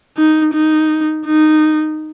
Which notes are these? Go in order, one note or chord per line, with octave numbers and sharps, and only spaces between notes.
D#4
D#4
D#4